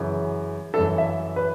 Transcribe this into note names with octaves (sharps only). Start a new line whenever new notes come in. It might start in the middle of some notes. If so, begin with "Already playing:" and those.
Already playing: F#2 C#3 E3
F#2 E3 A4
E5
B4